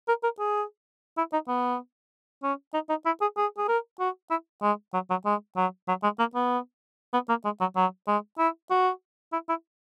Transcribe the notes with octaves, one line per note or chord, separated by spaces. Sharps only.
A#4
A#4
G#4
E4
D#4
B3
C#4
D#4
D#4
E4
G#4
G#4
G#4
A#4
F#4
E4
G#3
F#3
F#3
G#3
F#3
F#3
G#3
A#3
B3
B3
A#3
G#3
F#3
F#3
G#3
E4
F#4
E4
E4